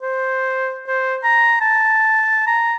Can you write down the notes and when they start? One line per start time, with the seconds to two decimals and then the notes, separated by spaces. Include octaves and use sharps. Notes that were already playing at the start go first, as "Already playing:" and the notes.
0.02 C5
0.87 C5
1.24 A#5
1.61 A5
2.47 A#5